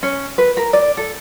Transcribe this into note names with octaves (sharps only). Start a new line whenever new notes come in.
C#4
B4
A#4
D5
A4